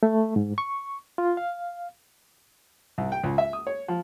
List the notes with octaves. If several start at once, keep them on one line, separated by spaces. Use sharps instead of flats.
A3
G#2
C#6
F4
F5
C2
G5
C#2
E5
D#6
C#5
F3